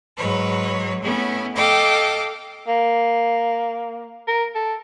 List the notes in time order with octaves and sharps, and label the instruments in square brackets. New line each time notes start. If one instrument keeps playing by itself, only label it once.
[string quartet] G#2 F#3 B4 C#5
A3 B3 C#4 E4
A4 D#5 F5 G5 D6
[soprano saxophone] A#3
A#4
A4